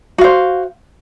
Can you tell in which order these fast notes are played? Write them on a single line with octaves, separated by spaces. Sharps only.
F#4 F5 C5